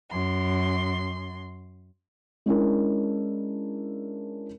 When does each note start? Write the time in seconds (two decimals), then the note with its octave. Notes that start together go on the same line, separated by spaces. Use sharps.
0.11 F#2 C6
2.46 G#3 C#4 D4 E4 A#4